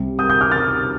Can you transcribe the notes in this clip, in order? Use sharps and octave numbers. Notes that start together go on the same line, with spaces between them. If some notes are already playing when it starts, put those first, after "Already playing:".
Already playing: C2 C3 G3
D#6 G6
D#6 G6
D6 F6
F6 A6